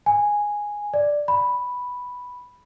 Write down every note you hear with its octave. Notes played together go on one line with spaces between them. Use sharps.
G#5
D5
B5